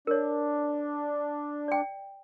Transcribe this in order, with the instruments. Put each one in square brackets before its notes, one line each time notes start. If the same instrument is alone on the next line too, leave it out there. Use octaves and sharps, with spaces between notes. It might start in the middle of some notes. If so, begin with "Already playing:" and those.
[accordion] D4 [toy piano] A#4 C#5
[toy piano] D5 G5